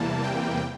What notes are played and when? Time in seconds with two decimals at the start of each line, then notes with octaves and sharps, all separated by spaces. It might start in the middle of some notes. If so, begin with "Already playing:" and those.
Already playing: E2 C3 E3 G3 A#3 A5
0.24 G5